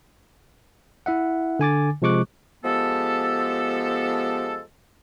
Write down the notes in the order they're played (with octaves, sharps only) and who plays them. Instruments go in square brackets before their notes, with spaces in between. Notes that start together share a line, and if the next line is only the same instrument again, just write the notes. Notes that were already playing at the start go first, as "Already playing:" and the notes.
[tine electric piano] E4 E5 F#5
D3 G#5 D6 A6
C3 F3 G#3 C#6 D6 F#6
[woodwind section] F3 G#3 B3 G4 A4